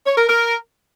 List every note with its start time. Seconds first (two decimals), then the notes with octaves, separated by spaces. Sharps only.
0.06 C#5
0.18 A#4
0.29 A#4